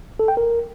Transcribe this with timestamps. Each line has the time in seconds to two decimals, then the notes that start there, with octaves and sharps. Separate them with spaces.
0.20 A4
0.28 G5
0.37 A#4